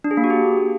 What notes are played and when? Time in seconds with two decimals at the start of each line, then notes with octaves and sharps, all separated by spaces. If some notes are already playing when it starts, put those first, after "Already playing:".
0.04 D4
0.11 G#4
0.17 A#3
0.24 F#4
0.30 G4